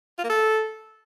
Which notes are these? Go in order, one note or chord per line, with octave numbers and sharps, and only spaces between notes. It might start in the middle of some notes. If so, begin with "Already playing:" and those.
F4
A#3
A4